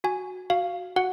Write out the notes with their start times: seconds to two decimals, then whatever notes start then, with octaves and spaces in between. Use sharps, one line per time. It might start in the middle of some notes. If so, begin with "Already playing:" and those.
0.04 F#4 G#5
0.50 F#4 F5
0.96 F#4 F#5